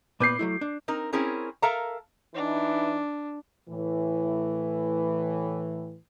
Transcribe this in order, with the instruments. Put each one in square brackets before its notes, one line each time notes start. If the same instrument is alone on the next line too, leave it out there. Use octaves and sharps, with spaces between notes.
[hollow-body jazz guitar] A#2 B3 B4 [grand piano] D6 G6 C7
[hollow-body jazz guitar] F#3 A3 E4
D4
[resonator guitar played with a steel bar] C4 D#4 A#4
C4 C#4 E4 G#4 A#4
A4 A#4 E5 F5 A5 A#5
[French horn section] E3 D#4 [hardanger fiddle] D4
[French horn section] A2 E3